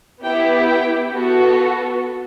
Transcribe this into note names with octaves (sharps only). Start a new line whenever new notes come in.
B3 E4 G4 G5
G5
B3 F#4 A4